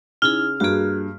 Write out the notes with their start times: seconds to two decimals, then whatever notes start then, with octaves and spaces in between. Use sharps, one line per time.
0.22 C#3 D#4 E4 G#4 F6
0.60 G2 A#3 F#4 G#4 D7